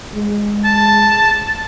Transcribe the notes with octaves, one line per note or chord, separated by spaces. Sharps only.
G#3
A5